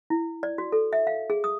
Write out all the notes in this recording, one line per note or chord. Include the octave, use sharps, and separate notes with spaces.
E4
D5
F#4
A4
E5
F5
G#4
D#6